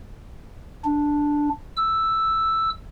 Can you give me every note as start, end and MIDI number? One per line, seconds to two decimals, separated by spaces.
0.85 1.50 62
1.77 2.70 88